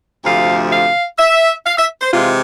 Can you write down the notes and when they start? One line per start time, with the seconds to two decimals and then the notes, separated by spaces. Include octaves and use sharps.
0.24 D2 C3 F3 A3 F5
0.71 F5
1.19 E5
1.66 F5
1.78 E5
2.01 C5
2.12 C3 E3 G#3 F4